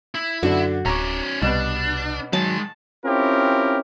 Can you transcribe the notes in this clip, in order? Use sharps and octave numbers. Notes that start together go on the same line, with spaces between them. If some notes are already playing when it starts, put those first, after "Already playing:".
E4
F#2 D3 D4 F#4
D1 C#4 D5 A#5 C#6
C2 B2 G3 B3 D4
D#3 F#3 G#3 A5
C4 C#4 E4 F4 G4 A#4